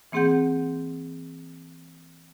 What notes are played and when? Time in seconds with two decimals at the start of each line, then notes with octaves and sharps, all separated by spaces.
0.12 E3 A#3 C4 G#4 F#5 G6